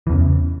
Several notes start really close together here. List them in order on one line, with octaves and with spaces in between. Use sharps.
E3 E2 C#3